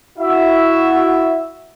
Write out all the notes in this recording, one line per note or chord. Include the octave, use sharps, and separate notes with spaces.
E4 F#4 E5